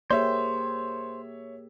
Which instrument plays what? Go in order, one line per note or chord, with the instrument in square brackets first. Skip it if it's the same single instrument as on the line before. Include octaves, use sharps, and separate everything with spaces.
[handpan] A#3 G4 G#4 [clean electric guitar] C5 [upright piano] C#5 E5